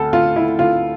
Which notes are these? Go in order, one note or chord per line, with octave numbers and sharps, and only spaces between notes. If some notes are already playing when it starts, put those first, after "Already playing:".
Already playing: D2 A4
D2 F4
E4
D2 F4